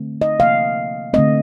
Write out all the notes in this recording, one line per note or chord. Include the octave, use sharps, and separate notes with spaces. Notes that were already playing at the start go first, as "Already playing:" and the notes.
Already playing: D3 A3 C4
D#5
C3 F3 A#3 F5
D3 A3 C4 D#5